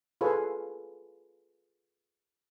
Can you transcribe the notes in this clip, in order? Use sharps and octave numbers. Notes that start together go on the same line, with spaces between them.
F4 G#4 A4 B4 C#5